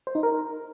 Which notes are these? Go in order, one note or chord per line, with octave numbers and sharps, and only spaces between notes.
C5
D#4
A#4